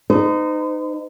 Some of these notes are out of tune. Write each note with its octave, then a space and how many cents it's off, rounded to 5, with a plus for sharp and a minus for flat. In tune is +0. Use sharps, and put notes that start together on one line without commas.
D#4 -15 C5 -45